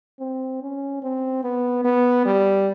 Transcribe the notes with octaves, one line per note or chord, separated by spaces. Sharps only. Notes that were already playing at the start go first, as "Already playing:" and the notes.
C4
C#4
C4
B3
B3
G3